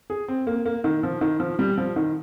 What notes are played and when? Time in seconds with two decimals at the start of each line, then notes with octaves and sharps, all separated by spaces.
0.10 G#4
0.28 C4
0.47 A#3
0.66 A#3
0.84 D#3
1.03 F3
1.21 D#3
1.40 F3
1.59 G3
1.78 F3
1.96 D#3